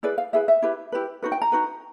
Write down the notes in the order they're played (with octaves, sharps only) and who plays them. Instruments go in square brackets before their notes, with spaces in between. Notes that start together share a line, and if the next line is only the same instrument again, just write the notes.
[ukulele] E4 G#4 B4 D5
F5
E4 G#4 B4 E5
E5
E4 G4 B4
E4 G4 B4
D#4 F#4 B4
G5
A#5
D#4 F#4 B4